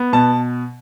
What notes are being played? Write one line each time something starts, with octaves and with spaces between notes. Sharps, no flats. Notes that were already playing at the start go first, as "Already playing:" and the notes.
Already playing: B3
B2 A5